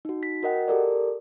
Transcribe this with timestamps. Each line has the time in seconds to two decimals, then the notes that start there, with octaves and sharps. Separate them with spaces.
0.05 D#4 F#4
0.23 B6
0.43 F#4 A#4 D#5 F#5 G5
0.68 G4 A4 A#4 D5